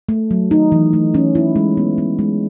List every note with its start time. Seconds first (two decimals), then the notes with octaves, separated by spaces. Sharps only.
0.09 A3
0.31 F#3
0.51 D#4
0.72 E3
0.93 A3
1.14 C#4
1.35 E4
1.56 G#3
1.77 B3
1.98 B3
2.19 G#3